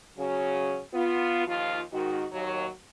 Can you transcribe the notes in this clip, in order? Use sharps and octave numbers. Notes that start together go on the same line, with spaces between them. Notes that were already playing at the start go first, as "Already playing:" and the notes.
C#3 F#3 C#4
B3 F4
D#2 F3 F4
G#2 D#3 F#4
D#2 F#3